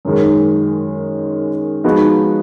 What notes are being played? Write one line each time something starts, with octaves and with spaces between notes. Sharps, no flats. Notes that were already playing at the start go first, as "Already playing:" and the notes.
F#2 D#3 G#3
F3 G#3 B3 D#4 F#4